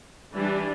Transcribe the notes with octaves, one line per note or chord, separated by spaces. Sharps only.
E3 G3 D4